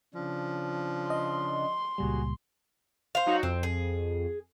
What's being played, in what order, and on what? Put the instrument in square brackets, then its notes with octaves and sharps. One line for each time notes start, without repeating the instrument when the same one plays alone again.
[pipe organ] C#3 D4 [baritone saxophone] F3
[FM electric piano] D#5 [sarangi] C6
[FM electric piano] C#2 A#2 G3 [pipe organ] F#4 G#4
[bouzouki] C5 F5
[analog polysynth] F#3 D#4 F#4
[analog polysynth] F2 [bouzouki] C4
[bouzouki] G#4